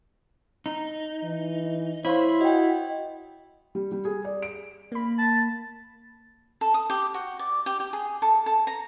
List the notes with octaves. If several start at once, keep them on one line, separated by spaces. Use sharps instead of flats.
D#4
E3
E4 C5 C#5 F5 C6
F#4 D#5 G5
G3
G3
G#4
D5
D7
A#3 B5
A5
A4
D#6
G4
F#4
D5
G4
G4
G#4
A4
A4
A#5